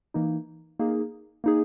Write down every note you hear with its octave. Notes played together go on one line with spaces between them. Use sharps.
E3 A#3 D#4
A#3 D#4 G#4
A#3 D#4 G#4